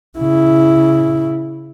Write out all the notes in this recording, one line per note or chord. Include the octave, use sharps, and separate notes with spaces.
C#3 E4